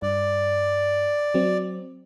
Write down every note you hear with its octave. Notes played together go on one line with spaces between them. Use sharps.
G2 D5
F#3 C4